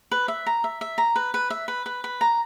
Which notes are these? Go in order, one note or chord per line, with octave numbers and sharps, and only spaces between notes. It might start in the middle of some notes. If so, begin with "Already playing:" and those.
B4
E5
A#5
E5
E5
A#5
B4
B4
E5
B4
B4
B4
A#5